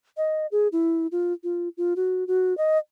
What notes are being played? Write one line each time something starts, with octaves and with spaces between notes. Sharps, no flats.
D#5
G#4
E4
F4
F4
F4
F#4
F#4
D#5